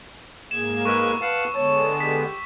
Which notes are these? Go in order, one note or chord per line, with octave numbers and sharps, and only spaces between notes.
G#2 A#3 G#4 G#6 E7
G#3 A#4 B4 C#6 E6
B4 F5 F#5 A5
D3 G#3 B3 C#5 A5
G4 B6